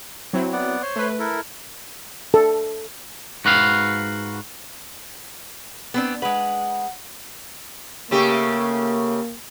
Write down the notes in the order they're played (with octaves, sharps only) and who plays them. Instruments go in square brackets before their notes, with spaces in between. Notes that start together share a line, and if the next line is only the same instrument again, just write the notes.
[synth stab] F#3 C4 E4
[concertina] B3 D5 F#5
C5 C#5 C6
[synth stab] A3 B4
[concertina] E4 A4 A#4
[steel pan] A4
[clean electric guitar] G#2 F#4 B4 F5
[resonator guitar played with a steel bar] B3 C4 D4
[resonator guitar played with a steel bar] G#3 B4 [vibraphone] F#5
[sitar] C#3 A3 G4 [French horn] A#3